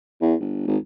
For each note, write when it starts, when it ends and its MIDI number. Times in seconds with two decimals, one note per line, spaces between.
0.21 0.35 40
0.40 0.63 31
0.67 0.77 32